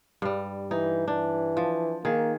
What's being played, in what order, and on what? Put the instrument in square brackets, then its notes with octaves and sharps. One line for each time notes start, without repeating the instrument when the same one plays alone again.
[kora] G2 G3
[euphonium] E3 [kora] D#4
[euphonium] E3 [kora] D4
[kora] F3
[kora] D#3 G#4 [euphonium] A#3